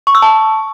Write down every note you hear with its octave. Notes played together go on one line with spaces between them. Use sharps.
C#6
E6
A5